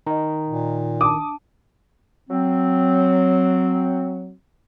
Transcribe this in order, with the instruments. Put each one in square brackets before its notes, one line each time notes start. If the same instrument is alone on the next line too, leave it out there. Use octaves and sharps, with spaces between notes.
[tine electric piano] D#3 [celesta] D#5 A#5
[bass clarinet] A#2
[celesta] D4 A5 [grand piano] D6 D#6
[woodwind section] F#3 C4